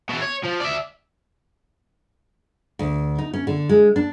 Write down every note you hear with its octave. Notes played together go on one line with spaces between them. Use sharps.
B2 E3
C#5
F3
D5 E5
D2
D#4
C#4
D3
G#3
D4